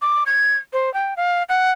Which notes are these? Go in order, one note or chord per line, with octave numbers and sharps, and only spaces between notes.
D6
G#6
C5
G5
F5
F#5